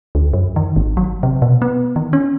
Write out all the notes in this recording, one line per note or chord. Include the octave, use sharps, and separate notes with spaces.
D2
F#2
D#3
G#1
F#3
C3
B2
B3
D#3
C#4